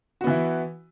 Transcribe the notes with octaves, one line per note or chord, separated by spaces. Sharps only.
E3 B3 E4 F#4